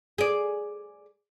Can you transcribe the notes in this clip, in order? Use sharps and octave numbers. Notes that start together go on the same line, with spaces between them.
G#4 D5